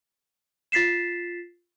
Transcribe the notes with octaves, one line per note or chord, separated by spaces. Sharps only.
F4 A6 B6 C7 E7